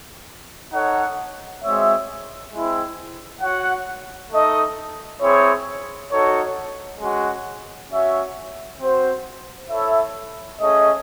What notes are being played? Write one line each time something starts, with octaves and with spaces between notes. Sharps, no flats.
D#4 A4 C#5 F#5
G#3 C4 F#4 C#5 E5
G#3 C4 E4
F#4 C#5 F#5
A3 D#4 A4 D#5
C4 E4 G#4 C#5
D#4 F#4 A4 C#5
G#3 C#4 F#4
C#4 F#4 C#5 E5
C4 F#4 C5
E4 A4 C#5 E5
A3 C#4 G#4 D#5